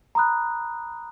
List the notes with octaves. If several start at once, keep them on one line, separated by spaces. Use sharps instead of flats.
A#5 B5 D#6 F#6